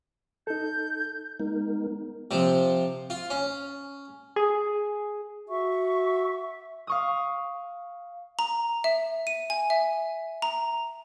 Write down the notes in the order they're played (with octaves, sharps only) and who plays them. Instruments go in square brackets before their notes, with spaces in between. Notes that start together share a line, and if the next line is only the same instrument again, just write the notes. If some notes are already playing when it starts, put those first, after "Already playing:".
[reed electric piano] D#4 A4 [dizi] G6
[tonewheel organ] G#3 B3 D#4 A#4
[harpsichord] C3 F3
F4
C#4
[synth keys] G#4
[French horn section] F#4 [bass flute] E5 [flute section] C#6
[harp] F5 C#6 D#6
[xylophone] A#5
E5
D#7
G#5
E5
A#5